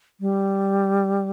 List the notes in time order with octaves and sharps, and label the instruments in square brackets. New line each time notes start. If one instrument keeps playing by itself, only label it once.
[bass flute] G3